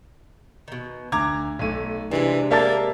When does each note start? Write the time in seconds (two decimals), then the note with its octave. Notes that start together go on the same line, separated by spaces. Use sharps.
0.68 B2 D#3
1.12 D2 A#5 D6 G#6
1.59 B1 A3 D#7
2.11 C3 E3 G#3 D4
2.51 A#3 D5 E5 A5 A6